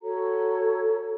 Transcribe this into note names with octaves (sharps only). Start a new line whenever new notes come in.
F#4 A4 C#5 A#5